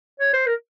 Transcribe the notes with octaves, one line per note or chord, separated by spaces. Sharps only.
C#5
C5
A#4